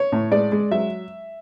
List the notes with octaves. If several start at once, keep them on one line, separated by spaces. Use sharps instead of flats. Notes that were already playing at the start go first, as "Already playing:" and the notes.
Already playing: C#5
A2
G#3 D5
G#3
F#3 E5